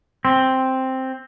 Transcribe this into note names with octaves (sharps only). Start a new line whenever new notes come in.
C4